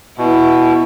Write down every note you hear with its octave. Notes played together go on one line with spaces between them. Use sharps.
B2 E4